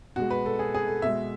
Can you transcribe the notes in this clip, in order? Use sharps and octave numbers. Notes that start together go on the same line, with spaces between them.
B2 G#3 F#4
B4
A4
G#4
G#4
A4
B2 G#3 E5